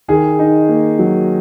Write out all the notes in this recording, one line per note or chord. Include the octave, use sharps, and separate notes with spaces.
D#3 G#4
D#4
A#3
F#3